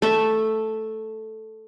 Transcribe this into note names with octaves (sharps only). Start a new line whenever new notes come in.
A3 E5